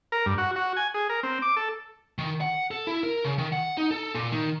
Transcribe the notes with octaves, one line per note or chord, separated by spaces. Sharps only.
A#4
G2
F#4
F#4
G#5
G#4
A#4
C4
D6
A4
D#3
F#5
A4
E4
A#4
C#3
D#3
F#5
D#4
A4
A#2
D#3